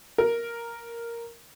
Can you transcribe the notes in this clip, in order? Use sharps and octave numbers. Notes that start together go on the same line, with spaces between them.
A#4